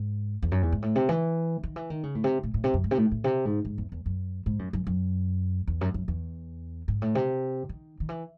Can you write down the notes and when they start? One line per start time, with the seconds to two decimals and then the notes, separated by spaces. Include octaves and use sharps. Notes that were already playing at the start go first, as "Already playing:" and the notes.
Already playing: G#2
0.42 E2
0.52 F#2
0.63 E2
0.72 G#2
0.82 A2
0.95 C3
1.09 E3
1.63 D#3
1.76 E3
1.90 D#3
2.03 C#3
2.15 A2
2.24 C3
2.43 A2
2.54 A2
2.64 C3
2.74 F#2
2.84 G#2
2.91 C3
2.98 A2
3.12 A2
3.24 C3
3.45 G#2
3.65 G#2
3.78 E2
3.92 E2
4.06 F#2
4.46 G#2
4.59 F#2
4.73 F#2
4.87 F#2
5.67 E2
5.81 F#2
5.94 F#2
6.08 E2
6.88 G#2
7.02 A2
7.15 C3
7.69 D#3
8.00 D#3
8.09 E3